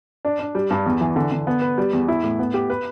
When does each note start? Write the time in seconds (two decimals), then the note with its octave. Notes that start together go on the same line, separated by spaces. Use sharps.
0.25 D4
0.39 D4
0.55 G3
0.71 G2
0.86 E2
1.01 E3
1.16 D3
1.32 D3
1.47 B3
1.62 B4
1.78 G3
1.93 E2
2.08 E4
2.23 A2
2.39 B3
2.54 G4
2.70 B4